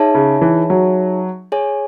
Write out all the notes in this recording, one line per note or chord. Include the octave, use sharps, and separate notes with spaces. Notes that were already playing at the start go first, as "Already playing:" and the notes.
Already playing: D#4 G#4 C#5 E5 A5
C#3
E3
F#3
G#4 C#5 G#5